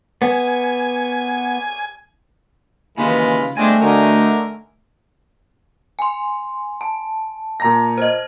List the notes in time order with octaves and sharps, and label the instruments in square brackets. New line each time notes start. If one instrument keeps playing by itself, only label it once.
[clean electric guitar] B3 [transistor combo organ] G#5
[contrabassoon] D#2 [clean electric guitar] C#3 [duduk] E3 [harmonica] G#3 F4 B5
[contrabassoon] G1 [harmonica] G#3 C4 D4 [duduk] A3 [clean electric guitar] G#5
[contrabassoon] D2 [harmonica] D3 D#4 A#4
[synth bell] G#5 C6
A5
[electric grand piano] A#2 A#5 A#6
[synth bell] C5 D#5